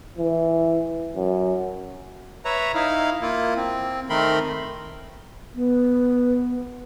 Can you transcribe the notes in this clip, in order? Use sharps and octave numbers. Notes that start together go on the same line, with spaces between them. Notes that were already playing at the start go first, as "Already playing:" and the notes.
E3
F#2
B4 C#5 E5 A#5
D#4 E4 F5
A#3 E4 F4
C4
D#3 A3 C4 A#4 B5 C6
B3